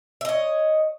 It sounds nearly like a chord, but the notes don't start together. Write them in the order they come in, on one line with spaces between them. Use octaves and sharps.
E5 D#5 C#5